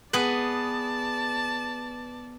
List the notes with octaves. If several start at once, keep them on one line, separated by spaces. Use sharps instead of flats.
B3 G#4 B4 D5 A5